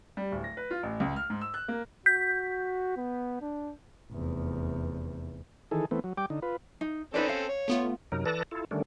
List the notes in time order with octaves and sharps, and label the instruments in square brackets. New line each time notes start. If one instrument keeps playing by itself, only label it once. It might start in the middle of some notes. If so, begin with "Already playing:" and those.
[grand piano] G3
D1
A#6
B4
F4
A1
C#2
F6
G#2
E6
F#6
A#3
[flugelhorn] F#4 [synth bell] G6 B6
[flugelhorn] B3
D4
[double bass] F1 E2
[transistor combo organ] D#3 E3 G#4 A4
E3 A3 B3 C4
F#3
G3 G5 D6
D3 D#4
F4 B4
[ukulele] D#4
[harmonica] C4 C#4 A4 [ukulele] D#4 B4 D5
[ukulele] F5
[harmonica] C#5
[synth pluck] A3 B3 F4
[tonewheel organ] F#2 C3 F#3 D#4 A#4
E3 A4 B4 D5 A5 A#6
E4 F4 A4
D3 D#3 G3 A3 C#4 D4